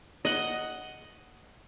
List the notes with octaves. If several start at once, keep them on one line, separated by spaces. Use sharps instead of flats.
D#5 F#5